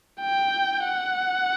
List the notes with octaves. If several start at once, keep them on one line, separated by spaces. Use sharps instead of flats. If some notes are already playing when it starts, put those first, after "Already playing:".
G5
F#5